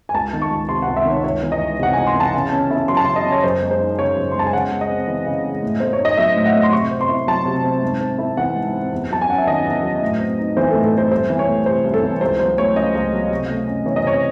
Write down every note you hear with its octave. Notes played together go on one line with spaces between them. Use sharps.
G#5
C#2 A5
D#3
C#6
C#2
C3 C6
F#5
C#2
E5
D#3 C#5
C#2 C#5
E3
D#5
C#2
C3 F#5
C#2 G#5
C6
E3 A5
C#3
C#4
E4
F#3 C6
A5
C#3 C6
D#5
C#4
C#5
F#2 C5
G#3
C5
D#4
C#3 C#5
F#2
C6
G#3 A5
G#5
C#3 F#5
G#3
D#5
C4
E3
C#3
G#3
A2
A3 C5
C#5
D#4
D#5
F#3 E5
A2
F#5
A3
C6
C3 C#6
C4
C6
E4
F#3 A5
C3
C4
G#2
C4
E4
E3 F#5
G#2
C4
E2
F#3 A5
G#5
C#4 F#5
E5
D#3 D#5
E2
F#3
A2
C4
D#4
E3 C5
A4
A2
A4
C4 C5
C2 C5
E3
C#5
A3
C3 C5
C2
A4
E3
C#2 C5
F#3 C5
A3 C#5
C#3 D#5
C#2
F#3
C3
A3
C#4
E3 C#5
D#5
C3 C#5